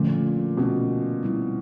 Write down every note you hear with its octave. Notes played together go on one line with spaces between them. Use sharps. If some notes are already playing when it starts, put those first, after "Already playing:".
Already playing: A#2 D3 F3 A3 C#4
B2 A3 C#4 F#4
G3 C4 E4